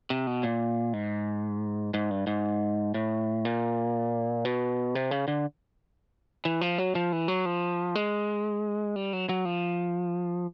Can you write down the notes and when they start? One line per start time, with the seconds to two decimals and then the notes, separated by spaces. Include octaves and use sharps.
0.10 C3
0.27 B2
0.43 A#2
0.93 G#2
1.94 G#2
2.11 G2
2.27 G#2
2.94 A2
3.45 A#2
4.45 B2
4.95 C3
5.11 C#3
5.28 D3
6.45 E3
6.61 F3
6.78 F#3
6.95 F3
7.12 E3
7.28 F#3
7.46 F3
7.95 G#3
8.96 G3
9.13 F#3
9.29 F#3
9.45 F3